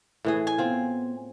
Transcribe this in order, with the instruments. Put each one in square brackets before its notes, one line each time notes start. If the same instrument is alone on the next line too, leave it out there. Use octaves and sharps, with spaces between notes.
[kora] A2 E3 G#4
[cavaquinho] G#5
[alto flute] B3 [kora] C4 F4